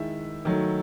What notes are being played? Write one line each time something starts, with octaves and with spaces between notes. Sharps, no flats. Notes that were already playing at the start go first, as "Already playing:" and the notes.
Already playing: D#3 G#3 E4 E5
D#3 F#3 A3